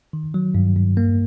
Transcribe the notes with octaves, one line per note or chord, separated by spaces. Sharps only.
D#3
F#3
G2
G2
A#3